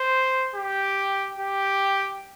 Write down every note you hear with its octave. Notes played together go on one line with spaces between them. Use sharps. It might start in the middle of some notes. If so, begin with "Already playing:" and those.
Already playing: C5
G4
G4